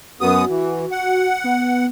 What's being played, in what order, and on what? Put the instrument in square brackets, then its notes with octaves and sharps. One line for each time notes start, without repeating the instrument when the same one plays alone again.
[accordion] F#2 B3 D#6 [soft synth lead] F#4
[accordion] E3
F#5
[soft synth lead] B3